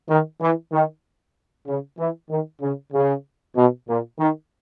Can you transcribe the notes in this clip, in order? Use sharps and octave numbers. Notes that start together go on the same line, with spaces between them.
D#3
E3
D#3
C#3
E3
D#3
C#3
C#3
B2
A#2
D#3